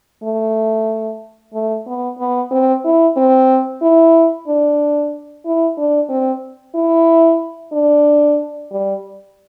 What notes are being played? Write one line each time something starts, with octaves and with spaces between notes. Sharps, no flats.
A3
A3
B3
B3
C4
E4
C4
E4
D4
E4
D4
C4
E4
D4
G3